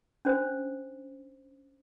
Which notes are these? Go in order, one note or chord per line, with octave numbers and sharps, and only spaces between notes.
C#4 D4 C5